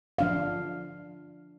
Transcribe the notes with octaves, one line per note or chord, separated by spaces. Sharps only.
F3 D4 F5